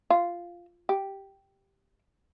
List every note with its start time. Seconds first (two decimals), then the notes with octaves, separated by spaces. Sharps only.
0.10 F4
0.89 G4